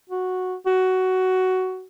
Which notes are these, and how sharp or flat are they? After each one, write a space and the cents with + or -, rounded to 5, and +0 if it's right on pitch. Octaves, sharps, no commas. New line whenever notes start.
F#4 -5
F#4 +10